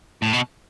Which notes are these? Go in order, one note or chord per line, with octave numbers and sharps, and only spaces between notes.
A2
B2